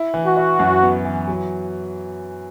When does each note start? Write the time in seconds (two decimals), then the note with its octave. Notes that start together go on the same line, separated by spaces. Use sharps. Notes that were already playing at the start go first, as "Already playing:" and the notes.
Already playing: E4
0.14 E3
0.25 F#4
0.37 E4
0.59 F#2
0.82 B3
1.05 E3
1.28 F#3